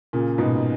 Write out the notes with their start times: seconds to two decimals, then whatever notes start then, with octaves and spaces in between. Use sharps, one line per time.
0.13 A#2 C#3
0.38 G#2 B2